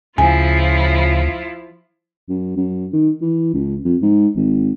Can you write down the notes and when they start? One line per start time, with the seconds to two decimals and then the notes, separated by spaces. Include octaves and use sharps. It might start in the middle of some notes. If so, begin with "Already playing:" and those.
0.18 D2 C#3 F3 E4 F4 G#5
2.29 F#2
2.57 F#2
2.93 D#3
3.21 E3
3.54 C#2
3.85 F2
4.02 G#2
4.36 G#1